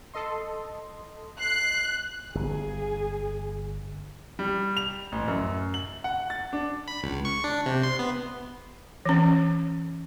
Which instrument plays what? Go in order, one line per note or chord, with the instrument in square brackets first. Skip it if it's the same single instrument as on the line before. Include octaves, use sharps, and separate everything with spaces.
[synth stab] A4 D#5 C6
[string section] F#6 [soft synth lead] C7
[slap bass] G1 [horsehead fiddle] G#4
[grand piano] G3
F7
A1
F#2
F#7
F#5
A6
D4
[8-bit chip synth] B5
C#2
C#6
D4
C3
C6
B3
[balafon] E3 C#4